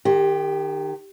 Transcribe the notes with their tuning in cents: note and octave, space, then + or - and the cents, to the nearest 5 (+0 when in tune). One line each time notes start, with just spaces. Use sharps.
D#3 -30 G4 +15